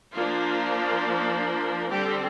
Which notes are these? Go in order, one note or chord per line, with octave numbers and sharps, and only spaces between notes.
F3 A#3 D4 F4
D3 G3 C4 G4